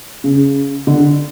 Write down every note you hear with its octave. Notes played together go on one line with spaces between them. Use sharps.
C#3
D3